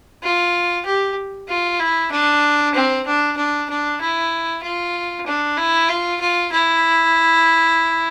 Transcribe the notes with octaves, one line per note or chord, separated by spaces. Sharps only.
F4
G4
F4
E4
D4
C4
D4
D4
D4
E4
F4
D4
E4
F4
F4
E4